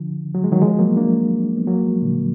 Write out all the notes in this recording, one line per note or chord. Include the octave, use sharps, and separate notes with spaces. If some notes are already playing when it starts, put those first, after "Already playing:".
Already playing: D3 F3
F#3
G#3
D#3 F#3
F3 G#3
F#3 A#3
A#3 D4
B3
F#3 A#3
F3 G#3
A#2 D3